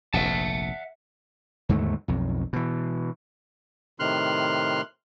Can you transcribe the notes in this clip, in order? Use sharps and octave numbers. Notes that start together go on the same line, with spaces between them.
F1 A#1 E5 F#5 A5
D#2 G#2 D3 A3
B1 F2
B2 E3
A2 C3 D#3 C6 F6 F#6